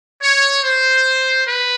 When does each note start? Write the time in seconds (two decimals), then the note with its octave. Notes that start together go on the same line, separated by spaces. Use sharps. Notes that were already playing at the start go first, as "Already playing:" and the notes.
0.23 C#5
0.64 C5
1.47 B4